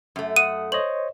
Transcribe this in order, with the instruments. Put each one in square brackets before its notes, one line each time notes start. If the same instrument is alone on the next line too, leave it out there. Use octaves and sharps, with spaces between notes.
[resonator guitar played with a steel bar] F#2 A3
[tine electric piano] F#5 D#6 [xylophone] D#7
[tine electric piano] C5 C#5 D#5 [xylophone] F#7